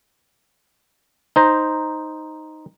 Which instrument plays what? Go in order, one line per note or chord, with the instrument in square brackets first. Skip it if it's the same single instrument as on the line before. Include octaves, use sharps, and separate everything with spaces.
[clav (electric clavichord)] D#4 C5 A#5